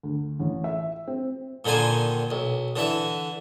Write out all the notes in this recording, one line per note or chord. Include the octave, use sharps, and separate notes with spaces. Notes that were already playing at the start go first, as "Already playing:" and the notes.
D2
A1
E5
C4
A#2 D3 D#3 C5 G#5
B1
D3 E3 E5